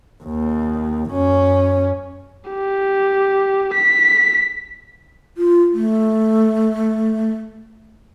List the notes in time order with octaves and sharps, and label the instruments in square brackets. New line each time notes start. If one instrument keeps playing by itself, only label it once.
[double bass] D#2
F#2 C#4
[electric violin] G4
B6
[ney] F4
A3